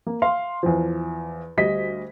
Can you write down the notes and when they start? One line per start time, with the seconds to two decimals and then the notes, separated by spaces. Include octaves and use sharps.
0.07 A#3
0.22 F5 C6
0.63 E2 F3
1.57 D2 G3 D#5 B6